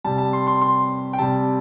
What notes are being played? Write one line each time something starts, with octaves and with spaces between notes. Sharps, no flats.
C3 G3 A5
A5
C6
C6
C6
G5
C3 G3 A5